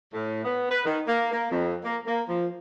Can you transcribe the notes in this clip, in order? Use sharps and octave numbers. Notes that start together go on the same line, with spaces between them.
A2
B3
B4
D#3
A#3
A#3
F2
A#3
A#3
F3